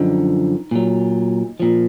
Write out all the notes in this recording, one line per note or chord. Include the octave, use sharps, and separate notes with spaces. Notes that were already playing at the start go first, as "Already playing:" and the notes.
Already playing: F#2 D3 F3 D#4
A#2 F#3
A#2 F3